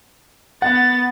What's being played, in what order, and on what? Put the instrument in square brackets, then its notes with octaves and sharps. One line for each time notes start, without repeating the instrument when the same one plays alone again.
[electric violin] B3 A6 [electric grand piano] F#5